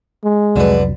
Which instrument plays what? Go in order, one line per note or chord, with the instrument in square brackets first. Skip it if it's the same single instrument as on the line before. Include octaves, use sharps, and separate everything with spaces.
[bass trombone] G#3
[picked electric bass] C2 F2 F#3 [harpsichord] D3 B4